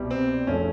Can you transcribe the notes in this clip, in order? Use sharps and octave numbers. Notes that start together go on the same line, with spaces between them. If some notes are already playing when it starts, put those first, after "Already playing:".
Already playing: C2 B2 G3
C4
F1 C#3 F3 A3 C#4